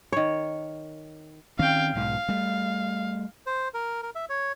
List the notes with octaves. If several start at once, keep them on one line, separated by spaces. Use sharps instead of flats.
D#3 C#5
D#3 C4 C#4 F5 G5
B1 G#2 B2 F5
G3 A3
C5
A#4
A#4
E5
C#5